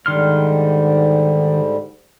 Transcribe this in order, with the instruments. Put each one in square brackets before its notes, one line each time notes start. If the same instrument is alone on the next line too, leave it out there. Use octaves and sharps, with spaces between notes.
[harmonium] G#2 D3 G3 [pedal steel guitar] D#3 C6 F6